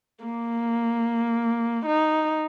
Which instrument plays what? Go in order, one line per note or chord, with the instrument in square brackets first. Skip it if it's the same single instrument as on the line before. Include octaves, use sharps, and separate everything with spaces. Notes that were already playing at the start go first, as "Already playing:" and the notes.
[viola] A#3
D#4